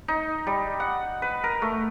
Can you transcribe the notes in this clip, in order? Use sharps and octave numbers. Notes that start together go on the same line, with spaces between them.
D#4
G3
F#5
B4
A#4
A3